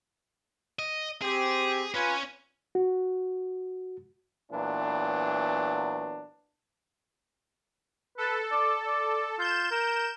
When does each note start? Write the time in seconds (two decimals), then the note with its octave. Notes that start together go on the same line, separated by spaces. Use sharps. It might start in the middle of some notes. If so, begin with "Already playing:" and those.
0.79 D#5
1.22 C4 G4 G#4
1.94 C#4 F4 B4 G#5
2.75 F#4
4.51 A#2 E3 F#3 B3 D4
8.18 A4 B4
8.51 D5
8.87 D5
9.39 F4 G6 E7
9.71 A#4